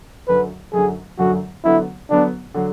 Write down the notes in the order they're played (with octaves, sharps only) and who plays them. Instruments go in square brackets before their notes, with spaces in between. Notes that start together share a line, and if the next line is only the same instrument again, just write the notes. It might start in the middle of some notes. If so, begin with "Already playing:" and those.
[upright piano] F#2 D3 F#3 [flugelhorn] B4
[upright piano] F#2 D3 F#3 [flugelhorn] G#4
[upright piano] F#2 D3 F#3 [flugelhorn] F#4
[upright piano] D3 F#3 B3 [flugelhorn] E4
[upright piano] D3 F#3 B3 [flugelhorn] D4
[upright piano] D3 F#3